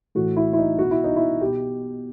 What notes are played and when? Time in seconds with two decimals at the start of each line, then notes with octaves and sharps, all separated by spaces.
0.15 A2 E3 F#4
0.37 E4
0.53 E4
0.58 D#4
0.79 B2 F#4
0.91 E4
1.04 D#4
1.16 E4
1.41 B2 G4